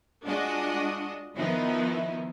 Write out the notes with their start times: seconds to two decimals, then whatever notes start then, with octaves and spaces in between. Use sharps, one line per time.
0.24 G#3 D4 F4 F#4 D#5
1.36 D#3 F3 B3 D#4 E4